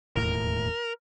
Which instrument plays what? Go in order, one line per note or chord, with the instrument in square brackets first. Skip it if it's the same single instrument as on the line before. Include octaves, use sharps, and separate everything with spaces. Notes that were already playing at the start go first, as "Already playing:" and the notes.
[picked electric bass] E1 D#2 A2 [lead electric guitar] A#4